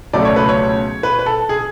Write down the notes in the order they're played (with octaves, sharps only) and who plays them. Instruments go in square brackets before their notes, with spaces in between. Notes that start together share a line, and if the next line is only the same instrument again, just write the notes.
[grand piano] C#2 B2 F#3 A3 D5
C#5
B4
C#5
B4
B4
A4
G#4